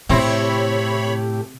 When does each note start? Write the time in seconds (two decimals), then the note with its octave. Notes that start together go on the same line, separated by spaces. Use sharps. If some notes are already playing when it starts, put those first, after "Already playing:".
0.09 A2 C3 C4 E4 G4 C#5 B5